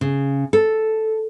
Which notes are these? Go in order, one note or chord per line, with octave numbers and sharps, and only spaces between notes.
C#3
A4